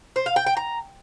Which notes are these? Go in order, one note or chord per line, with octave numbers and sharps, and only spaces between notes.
C5
F5
G5
G5
A#5